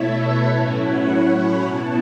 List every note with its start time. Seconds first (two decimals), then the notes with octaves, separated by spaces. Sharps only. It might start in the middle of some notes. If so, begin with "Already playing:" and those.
Already playing: B2 A3 E4 A4 C#5 E5
0.15 B4
0.45 A2 F#3 C#4 E4 C#5
0.75 F#5
1.33 B5
1.62 B2 B3 E4 A5